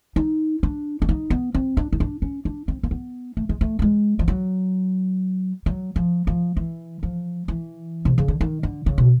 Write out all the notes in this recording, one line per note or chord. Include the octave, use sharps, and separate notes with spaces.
D#4
D4
D4
D#4
B3
C4
D4
D#4
D4
C#4
D4
C4
A#3
B3
A3
G#3
A3
G3
G#3
F3
F#3
F#3
F3
F3
E3
F3
E3
C3
C#3
D3
D#3
D3
C#3
B2